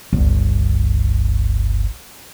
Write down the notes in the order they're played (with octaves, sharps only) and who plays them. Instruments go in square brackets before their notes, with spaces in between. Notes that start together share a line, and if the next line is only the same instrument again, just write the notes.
[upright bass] G1 C#2